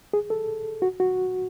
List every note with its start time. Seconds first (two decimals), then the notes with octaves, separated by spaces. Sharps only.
0.13 G#4
0.30 A4
0.82 F#4
1.00 F#4